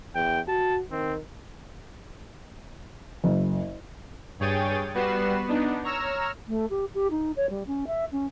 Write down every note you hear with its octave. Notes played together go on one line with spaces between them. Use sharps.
E2 G5
F#4 A5
D#3 C4
F#1
G2 G#4 C#5 G5 A6 D#7
G3 B3 F#4 B4 C7 E7
B3 D4 D#4
C#5 A#5 E6 F6 E7
A3
G4
G4
D#4
C#5
G3
C#4
E5
C#4